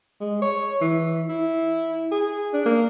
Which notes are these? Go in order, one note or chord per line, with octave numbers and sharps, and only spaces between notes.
G#3
C#5
E3
E4
G#4
D4
A#3